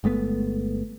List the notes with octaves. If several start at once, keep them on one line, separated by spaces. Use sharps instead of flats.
G1 G#3 A3 B3